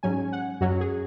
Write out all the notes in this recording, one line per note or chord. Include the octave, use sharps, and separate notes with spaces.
G#2 F#3 C#4 G#5
F#5
F#2 F#3 C#4 F#4
G#4